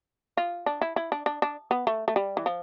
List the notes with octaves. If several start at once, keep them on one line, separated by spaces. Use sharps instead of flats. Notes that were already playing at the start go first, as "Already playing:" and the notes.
F4
D4
E4
E4
D4
D4
D4
B3
A3
A3
G3
E3
F3